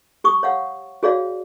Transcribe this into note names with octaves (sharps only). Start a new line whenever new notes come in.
G4 C#6 D#6
C#5 F5 F#5
F#4 G#4 C#5 D5 F5